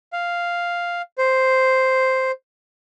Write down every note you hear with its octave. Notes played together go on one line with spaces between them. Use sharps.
F5
C5